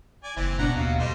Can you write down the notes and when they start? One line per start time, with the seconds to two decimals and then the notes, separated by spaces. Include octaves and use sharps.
0.24 D5 G#5
0.37 F#1 E3 C4 E4
0.59 B2 D4 F#5 A#5
0.75 D#2 F#3 F5
0.99 G3 A3 C5 D#5